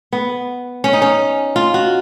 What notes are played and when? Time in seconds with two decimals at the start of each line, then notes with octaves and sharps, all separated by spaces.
0.13 B3
0.84 C#4
0.93 D#4
1.02 C#4
1.56 F4
1.74 F#4